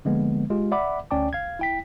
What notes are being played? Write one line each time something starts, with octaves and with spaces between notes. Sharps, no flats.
D3 F3 G#3 A#3 B3
G#3 F4 G4
D5 E5 F#5 B5 D6
D2 C#4 D5 G5 A5 D6
F5 G#6
E4 G5 B6